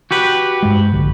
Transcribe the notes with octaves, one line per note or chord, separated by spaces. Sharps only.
F#4 G4 B4
G2 G#3
A#1 D3